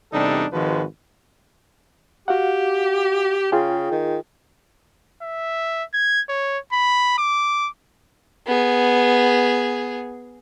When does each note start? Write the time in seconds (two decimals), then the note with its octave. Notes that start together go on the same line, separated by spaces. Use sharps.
0.12 E2 C3 G3 D4 D#4 A4
0.53 G#1 D#3 F3 G#3 F#4 B4
2.28 F#4 G4 F5 F#5
3.52 C#3 F4 G#4 G5
3.91 D#3
5.22 E5
5.93 G#6
6.29 C#5
6.72 B5
7.18 D6
8.47 B3 G#4